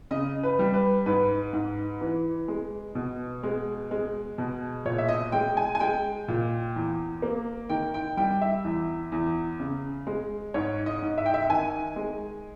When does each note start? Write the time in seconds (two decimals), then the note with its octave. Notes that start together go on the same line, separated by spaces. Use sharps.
0.11 C#3 D#5
0.43 B4
0.59 G3
0.74 B4
1.06 G#2 B4
1.53 G#2
2.01 E3
2.48 G#3
2.95 B2
3.43 G#3
3.91 G#3
4.38 B2
4.85 A#2 C#5
4.98 E5
5.09 D#5
5.32 G#3 G5
5.57 G#5
5.75 G#5
5.80 G#3 G5
6.28 A#2
6.76 E2
7.22 A#3
7.69 D#3 G5
7.94 G5
8.17 G3 G5
8.42 E5
8.64 E2
9.12 E2
9.60 C#3
10.07 G#3
10.54 G#2 C#5
10.86 D#5
11.02 G#2
11.18 E5
11.26 G5
11.34 E5
11.50 D#3 G#5
11.96 G#3